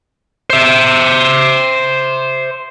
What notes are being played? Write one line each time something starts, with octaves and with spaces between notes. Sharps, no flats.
C5 E5